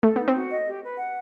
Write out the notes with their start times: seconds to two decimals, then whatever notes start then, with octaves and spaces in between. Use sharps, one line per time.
0.03 A3 A4
0.16 B3
0.19 D#4
0.28 C4
0.35 F#4
0.51 D#5
0.66 G4
0.82 B4
0.98 F#5